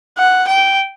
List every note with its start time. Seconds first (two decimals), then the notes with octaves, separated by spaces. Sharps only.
0.18 F#5
0.48 G5